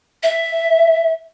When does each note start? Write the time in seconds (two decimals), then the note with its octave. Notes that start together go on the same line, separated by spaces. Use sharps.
0.23 E5